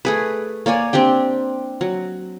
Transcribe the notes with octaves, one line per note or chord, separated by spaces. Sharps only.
A3 G#4 B4
A#3 C#5 D5 G#5
C4 D4 G4 G5
F#3